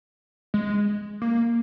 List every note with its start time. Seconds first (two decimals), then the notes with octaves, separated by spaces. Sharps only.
0.54 G#3
1.22 A#3